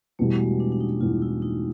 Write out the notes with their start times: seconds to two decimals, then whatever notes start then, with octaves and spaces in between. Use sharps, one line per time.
0.19 E2 B2 G3 A3
0.40 G#3
0.60 D4
0.72 D4
0.81 D#4
1.01 E2 B2 G3 F4
1.22 E4
1.42 D#4